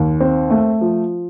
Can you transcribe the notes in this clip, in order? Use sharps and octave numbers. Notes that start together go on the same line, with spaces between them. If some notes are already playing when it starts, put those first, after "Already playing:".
Already playing: D#2
C4
A3
F3